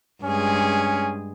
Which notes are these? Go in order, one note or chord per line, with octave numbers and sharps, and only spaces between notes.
G2 G#3 C#4 G#4